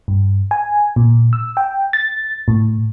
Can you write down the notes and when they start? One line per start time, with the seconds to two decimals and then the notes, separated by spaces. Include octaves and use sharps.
0.08 G2
0.51 G#5
0.96 A#2
1.33 E6
1.57 G5
1.93 A6
2.48 A2